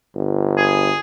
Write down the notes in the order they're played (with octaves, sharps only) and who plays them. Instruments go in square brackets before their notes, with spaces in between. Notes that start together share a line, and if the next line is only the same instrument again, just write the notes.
[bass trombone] G1
[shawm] G#4